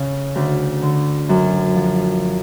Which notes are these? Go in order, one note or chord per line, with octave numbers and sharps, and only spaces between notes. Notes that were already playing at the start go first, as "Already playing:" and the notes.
Already playing: C#3
D2
D3
F#2
F3